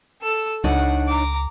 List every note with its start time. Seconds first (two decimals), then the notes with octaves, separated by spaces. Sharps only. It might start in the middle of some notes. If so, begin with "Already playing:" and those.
0.22 A4 E6
0.64 C#2 D4 D#4 C#5 F#5
1.08 A#5 D6